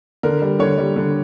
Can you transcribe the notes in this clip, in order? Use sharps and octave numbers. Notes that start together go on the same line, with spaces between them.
D3 A#4
G3
D3 C#5
G3
D3